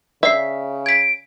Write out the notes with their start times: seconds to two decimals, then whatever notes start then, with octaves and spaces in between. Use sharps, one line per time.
0.23 C#3 D5 E5 C7
0.86 G#6 B6 D7